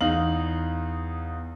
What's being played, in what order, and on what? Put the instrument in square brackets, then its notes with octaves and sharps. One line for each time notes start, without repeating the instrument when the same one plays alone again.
[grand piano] E2 D#4 F5 F#7